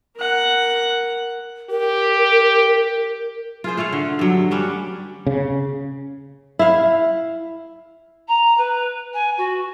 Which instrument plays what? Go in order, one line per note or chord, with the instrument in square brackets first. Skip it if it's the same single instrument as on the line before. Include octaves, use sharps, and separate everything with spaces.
[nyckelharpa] A#4 F#5
[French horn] G4 [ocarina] A#4
[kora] F4 G#4 C5
A3 F4 C#5 F5
D3
G2 F#3
G3 C#4 D4
[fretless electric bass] C#3
[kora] E4 F5
[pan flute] A#5
B4
G#5
F#4